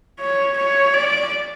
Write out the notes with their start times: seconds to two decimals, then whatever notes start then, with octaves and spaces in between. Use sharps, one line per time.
0.20 C#5
0.57 C#5
0.93 D5